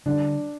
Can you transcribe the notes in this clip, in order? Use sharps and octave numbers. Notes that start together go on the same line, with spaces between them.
D3 G3 D4